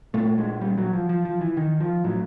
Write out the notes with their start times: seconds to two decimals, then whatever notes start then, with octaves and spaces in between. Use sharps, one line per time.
0.14 A#2 A3
0.38 G#3
0.61 G3
0.78 F#3
0.93 F3
1.09 F3
1.25 F3
1.41 E3
1.57 D#3
1.80 F3
2.04 A2 F#3